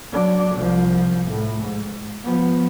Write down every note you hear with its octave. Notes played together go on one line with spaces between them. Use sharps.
F#3 D4
C2 F3
A2
G#2
F3 B3